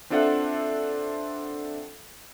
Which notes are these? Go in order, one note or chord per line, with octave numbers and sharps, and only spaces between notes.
C4 D4 F4 A4 E5 F#5